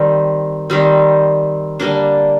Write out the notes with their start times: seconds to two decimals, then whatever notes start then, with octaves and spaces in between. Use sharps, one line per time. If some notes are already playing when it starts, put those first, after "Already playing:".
Already playing: D#3 G3 C4
0.70 D#3 G3 C4
1.80 D3 G3 A#3 D4